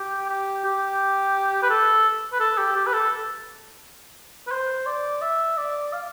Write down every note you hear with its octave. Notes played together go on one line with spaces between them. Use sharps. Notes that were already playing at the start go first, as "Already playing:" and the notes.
Already playing: G4
G4
G4
B4
A4
B4
A4
G4
G4
B4
A4
B4
C5
D5
E5
D5
F5